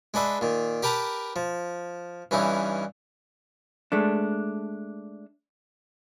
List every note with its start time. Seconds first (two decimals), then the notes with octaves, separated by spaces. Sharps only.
0.14 G#3 D4 B4 E5
0.41 A#2 D#3
0.83 G4 A#4 B4 A5 A#5
1.36 F3
2.31 G2 E3 C#4 D#4 E4
3.92 G#3 A3 D4